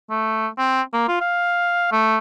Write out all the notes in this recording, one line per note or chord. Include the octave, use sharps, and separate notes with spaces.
A3
C4
A#3
F4
F5
A3